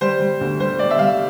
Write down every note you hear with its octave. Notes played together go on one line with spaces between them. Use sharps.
G3 C5
G3
D2
G3 C5
G3 D5
E5
G3 F5